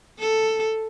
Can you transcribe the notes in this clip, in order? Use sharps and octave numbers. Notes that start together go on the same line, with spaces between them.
A4